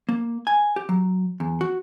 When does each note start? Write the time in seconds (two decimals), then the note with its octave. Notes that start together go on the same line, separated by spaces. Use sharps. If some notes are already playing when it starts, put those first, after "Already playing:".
0.09 A#3
0.47 G#5
0.76 G4
0.89 F#3
1.40 E2
1.61 F#4